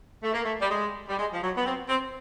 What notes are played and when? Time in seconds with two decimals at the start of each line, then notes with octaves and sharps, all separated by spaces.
0.23 A3
0.34 A#3
0.44 A3
0.60 G3
0.71 G#3
1.09 G3
1.18 G#3
1.33 F3
1.42 F#3
1.57 B3
1.66 C4
1.89 C4